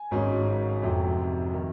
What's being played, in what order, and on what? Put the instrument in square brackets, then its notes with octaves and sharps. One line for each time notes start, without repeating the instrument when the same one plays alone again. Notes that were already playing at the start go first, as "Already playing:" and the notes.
Already playing: [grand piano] G#5
G#1 G#2 F#3 C#4
F1 F2 C3 F#3
D#3